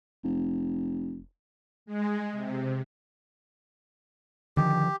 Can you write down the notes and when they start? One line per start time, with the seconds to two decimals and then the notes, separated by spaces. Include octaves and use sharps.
0.24 F1
1.86 G#3
2.33 C3
4.57 D3 D#3 F3 G4